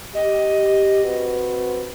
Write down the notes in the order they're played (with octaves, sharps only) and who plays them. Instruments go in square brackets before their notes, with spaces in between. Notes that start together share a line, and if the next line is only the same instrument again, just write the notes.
[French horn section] G4 [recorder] D#5
[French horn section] C4 F#4 B4